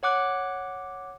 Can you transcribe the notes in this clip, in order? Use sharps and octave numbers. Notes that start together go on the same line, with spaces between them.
C#5 F#5 D6 F#6